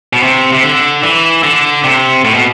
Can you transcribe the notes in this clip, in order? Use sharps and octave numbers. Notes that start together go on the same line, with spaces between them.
B2
C3
C3
D3
E3
D3
C3
A2
B2